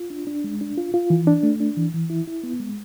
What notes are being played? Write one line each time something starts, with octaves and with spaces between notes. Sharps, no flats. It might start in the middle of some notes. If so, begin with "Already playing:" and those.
Already playing: F4
D4
D4
G#3
D4
F4
F4
E3
D4
A3
D4
E3
E3
E4
E4
B3
G#3